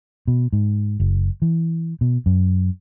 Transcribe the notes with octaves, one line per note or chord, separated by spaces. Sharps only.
B2
G#2
F#1
E3
B2
F#2